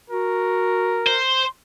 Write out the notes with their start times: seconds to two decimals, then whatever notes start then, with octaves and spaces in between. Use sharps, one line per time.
0.10 F#4 A#4
1.07 C5